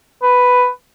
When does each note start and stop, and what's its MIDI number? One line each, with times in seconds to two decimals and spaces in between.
0.23 0.67 71